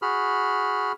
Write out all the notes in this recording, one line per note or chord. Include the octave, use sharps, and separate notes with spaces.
F#4 G#4 B5 F6